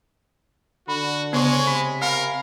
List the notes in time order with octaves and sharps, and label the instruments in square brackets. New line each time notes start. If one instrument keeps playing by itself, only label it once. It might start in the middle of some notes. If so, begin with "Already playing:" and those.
[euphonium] D3 [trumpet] F#4 [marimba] B5
[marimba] C#3 B3 [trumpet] G#3 [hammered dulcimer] C5 C#5 G#5
[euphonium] C3 [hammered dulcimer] B5
[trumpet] A#4 [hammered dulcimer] F5 B5